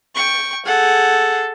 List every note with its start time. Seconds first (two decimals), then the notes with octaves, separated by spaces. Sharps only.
0.15 G5 C#6
0.65 G#4 A4 F#5